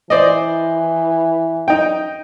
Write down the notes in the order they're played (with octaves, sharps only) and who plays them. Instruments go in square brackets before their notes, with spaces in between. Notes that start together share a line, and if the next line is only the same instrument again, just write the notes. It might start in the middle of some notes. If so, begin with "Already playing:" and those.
[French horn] E3 [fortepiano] C5 D5 D#5
[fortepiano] D#4 G5